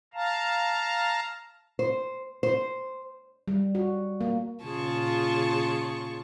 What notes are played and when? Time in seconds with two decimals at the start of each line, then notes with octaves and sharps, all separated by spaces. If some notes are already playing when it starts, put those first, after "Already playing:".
0.14 F5 A5 A#5
1.79 C5
2.43 C5
3.48 G3
3.75 F#4
4.21 A#3
4.63 A#2 C#3 F4 G#4 A5 C#6